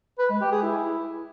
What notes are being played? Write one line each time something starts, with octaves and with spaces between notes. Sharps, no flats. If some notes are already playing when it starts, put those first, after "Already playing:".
B4
G#3
G4
G#4
E4